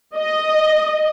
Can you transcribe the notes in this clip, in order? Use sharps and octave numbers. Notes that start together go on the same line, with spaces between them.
D#5